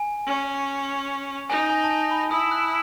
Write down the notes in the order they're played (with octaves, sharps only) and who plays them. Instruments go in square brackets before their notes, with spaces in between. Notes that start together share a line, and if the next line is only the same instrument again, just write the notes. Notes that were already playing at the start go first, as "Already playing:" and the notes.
Already playing: [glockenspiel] G#5
[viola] C#4
[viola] D#4 [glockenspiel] G#5
[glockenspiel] G#5
A5
G#5
B5
[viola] E4 [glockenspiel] D#6
[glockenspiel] F#6